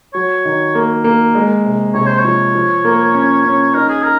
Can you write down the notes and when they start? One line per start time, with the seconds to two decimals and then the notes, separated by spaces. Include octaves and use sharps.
0.14 F#3 C#5
0.45 D#3
0.75 A#3
1.04 A#3
1.35 G#3
1.65 C3
1.94 C3 C#5
2.07 C5
2.19 C#5
2.25 F3
2.55 F3
2.85 A#3
3.15 C#4
3.45 C#4
3.75 D#4 A#4
3.89 G#4
4.03 A#4